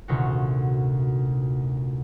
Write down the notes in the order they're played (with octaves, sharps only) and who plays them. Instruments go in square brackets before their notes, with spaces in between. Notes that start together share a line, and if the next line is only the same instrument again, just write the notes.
[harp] D#1 D2 C3 F4 F#4